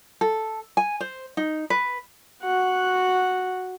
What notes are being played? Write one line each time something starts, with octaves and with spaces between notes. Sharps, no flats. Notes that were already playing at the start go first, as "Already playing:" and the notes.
A4
G#5
C5
D#4
B4
F#4 F#5